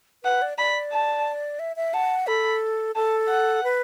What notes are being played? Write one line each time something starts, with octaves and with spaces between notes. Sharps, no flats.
B4 F#5
D5
D5 B5
A5
E5
E5
F#5 A5
A4 B5
A4 A5
F#5
B4